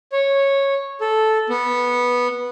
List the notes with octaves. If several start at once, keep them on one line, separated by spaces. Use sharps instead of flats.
C#5
A4
B3